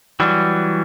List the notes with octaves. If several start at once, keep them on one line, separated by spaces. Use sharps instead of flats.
E3 F#3 G3